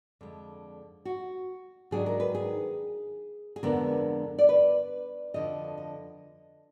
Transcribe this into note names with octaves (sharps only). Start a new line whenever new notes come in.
F2 D3 G#3
F#4
G#2 D#3 F#3 D4 G#4
A#4
B4
G#4
G#4
F2 D3 G#3 B3 D4 A#4
D5
B4
F2 D3 F3 D#5
D#5